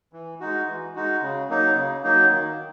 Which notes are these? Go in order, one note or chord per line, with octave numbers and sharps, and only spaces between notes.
E3
G#3 D#4 F#4
E3
G#3 D#4 F#4
C#3
F#3 A#3 D#4
C#3
F#3 A#3 D#4
D#3